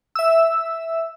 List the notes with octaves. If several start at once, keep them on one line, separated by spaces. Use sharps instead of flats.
E5 E6